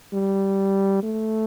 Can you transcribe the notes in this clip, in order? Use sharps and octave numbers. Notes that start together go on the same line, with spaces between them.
G3
A3